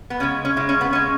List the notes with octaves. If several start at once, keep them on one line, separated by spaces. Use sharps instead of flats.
B3
C#3 G#3 C#4
C#4
C#3 G#3 E4
C#4
B3
C#3 G#3 C#4